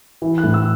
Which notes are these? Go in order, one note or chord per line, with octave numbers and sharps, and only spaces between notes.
E3
F#6
A2
E6